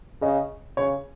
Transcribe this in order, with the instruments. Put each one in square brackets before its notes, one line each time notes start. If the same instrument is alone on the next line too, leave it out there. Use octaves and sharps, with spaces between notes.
[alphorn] C#3 [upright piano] D#5
[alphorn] C#3 [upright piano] C#5